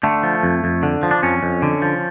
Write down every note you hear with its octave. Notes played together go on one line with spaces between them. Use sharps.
D3 A3
F3
F2
F2
D3
F3
D4
F2 C#4
F2
D3
F3